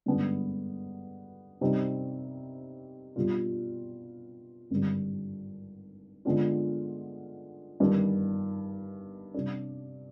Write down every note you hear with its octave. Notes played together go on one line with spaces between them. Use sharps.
G2 D3 G#3 B3 D4
C3 G3 C4 D#4
B2 G3 D4 F4
G#1 G2 D3 G3
D3 G#3 B3 D4 F4
G1 G2 D#3
C3 G3 D4